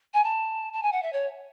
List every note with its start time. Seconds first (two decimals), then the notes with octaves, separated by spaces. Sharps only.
0.14 G#5
0.24 A5
0.73 A5
0.82 G#5
0.92 F#5
1.02 E5
1.12 C#5